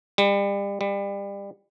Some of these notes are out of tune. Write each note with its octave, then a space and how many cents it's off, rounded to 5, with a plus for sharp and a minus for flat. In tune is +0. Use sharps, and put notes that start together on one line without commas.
G3 +35
G3 +30